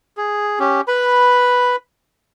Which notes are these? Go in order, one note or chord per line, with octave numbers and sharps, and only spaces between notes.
G#4
C#4 G4
B4 B5